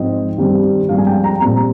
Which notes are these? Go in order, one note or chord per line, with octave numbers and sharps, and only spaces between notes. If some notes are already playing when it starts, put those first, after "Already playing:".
Already playing: G#2 F3 C4 D#5
G2 D#3 G3 C4
G2 F3 G#3 C4 F5
G#5
G5
A#5
A#2 G3 C4 A#5